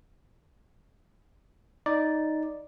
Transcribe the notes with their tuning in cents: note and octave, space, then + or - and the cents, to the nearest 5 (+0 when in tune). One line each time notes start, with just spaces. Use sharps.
D#4 +0 D5 +0